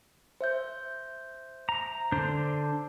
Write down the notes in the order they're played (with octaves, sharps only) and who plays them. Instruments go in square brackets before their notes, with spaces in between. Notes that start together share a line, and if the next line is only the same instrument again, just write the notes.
[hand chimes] C5 E5 G6
[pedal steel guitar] A#5
D3 D4 C5